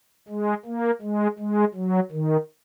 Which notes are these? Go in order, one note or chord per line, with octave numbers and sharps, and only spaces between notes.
G#3
A#3
G#3
G#3
F#3
D#3